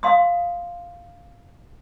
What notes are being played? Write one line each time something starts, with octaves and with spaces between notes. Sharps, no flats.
F5 C6 D#6